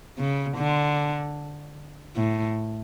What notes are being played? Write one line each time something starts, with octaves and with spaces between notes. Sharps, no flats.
C#3
D3
A2